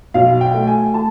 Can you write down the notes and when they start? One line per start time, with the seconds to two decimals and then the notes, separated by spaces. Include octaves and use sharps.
0.14 B1 F5
0.41 G5
0.54 A3
0.67 G#5
0.94 A3 A5